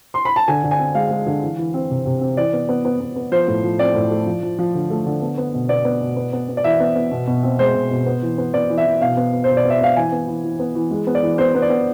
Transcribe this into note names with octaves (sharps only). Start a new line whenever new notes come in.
C6
B5
A5
D3 G#5
D3
G#5
C4
G#3 F5
G#3
D3
E3
E3
C4
C3
C3
C4
E3 D5
B3
B3
B3
B3
B3
F3 C5
A2
F3
C4 D5
A2
A3
F3
F3
F3
D3
A3
D3
B3
B3
B2
B3 D5
B3
B2
B3
B3
B3
D5
E3 E5
B3
B3
B2
B2
C4
G#3 C5
B2
B2
B3
E3
B3
B3 D5
E3
E5
E3
B2 F5
B3
B3
B2 C5
D5
B3
E5
B3 F5
E3 G#5
B3
E3
E3
B3
E3
G#3
B3
D5
E3
B3 C5
B3
D5
B3